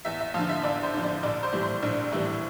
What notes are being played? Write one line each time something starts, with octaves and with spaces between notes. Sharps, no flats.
E2 E5
E5
D3 F3 F5
E5
E2 D5
C5
D3 F3
D5
A#1 D5
C5
A2 E3 G3
C5
A#1 D4
A2 E3 G3 E4